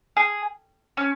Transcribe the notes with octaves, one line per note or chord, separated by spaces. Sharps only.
G#4
C#4